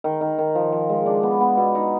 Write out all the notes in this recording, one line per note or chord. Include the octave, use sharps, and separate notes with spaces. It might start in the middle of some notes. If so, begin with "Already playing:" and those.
D#3
D#3
D#3
F3
F3
G#3
D4
B3
B3
B2
D#4